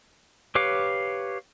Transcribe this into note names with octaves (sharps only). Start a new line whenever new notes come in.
G4 B4 C#5 F5 D6